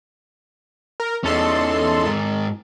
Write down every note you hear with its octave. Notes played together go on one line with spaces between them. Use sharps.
A#4
E2 C#4 D#4 A4 C6
G#2 A#4